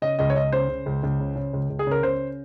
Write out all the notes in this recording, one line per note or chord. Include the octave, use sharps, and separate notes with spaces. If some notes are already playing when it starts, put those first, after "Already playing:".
C#3 D#5
C#2 D#5
C#5
C#2 D#5
C#3 C5
C#3
C#2
C#2
C#3
C#3
C#2
C#2
G#4
C#3 A#4
C#3 C5